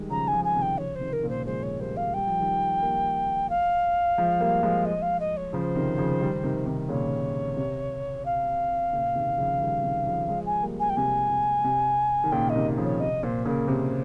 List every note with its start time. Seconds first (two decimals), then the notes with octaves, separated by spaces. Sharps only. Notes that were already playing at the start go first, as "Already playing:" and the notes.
Already playing: D#3 G3 G#3
0.10 C#3 F3 A#5
0.27 G#5
0.33 C#3 F3
0.44 G#5
0.55 C3 D#3
0.62 G5
0.77 C#3 F3 C#5
0.95 C5
1.00 C3 D#3
1.13 A#4
1.23 A#2 C#3
1.29 C5
1.45 F3 G#3 C5
1.63 C#5
1.79 G3 A#3 C5
1.97 F5
2.14 G3 G5
2.27 F3
2.40 D#3 G3
2.81 G3 A#3
3.49 F5
4.18 F3 G#3
4.40 G3 A#3
4.63 F3 G#3
4.85 D#5
5.02 F5
5.20 D#5
5.37 C#5
5.53 C#3 F3 C5
5.75 C3 D#3
5.98 C#3 F3
6.21 D#3 G3
6.44 C3 D#3
6.66 C3 D#3
6.89 A#2 C#3 C#5
7.57 C3
8.25 F5
8.92 A#2 C#3
9.15 C3 D#3
9.38 C#3 F3
9.61 D#3 G3
9.83 C3 D#3
10.06 C#3 F3
10.29 F3 G#3
10.46 G#5
10.62 G3 A#3
10.79 G#5
10.89 G5
10.96 C3 G#5
11.30 C3
11.64 C3
12.24 D#3
12.32 A#2 C#3 G5
12.49 D#5
12.56 C3 D#3
12.78 C#3 F3
12.84 C#5
13.00 C3 D#5
13.23 A#2 C5
13.46 A#2 C#3 A#4
13.68 C3 C5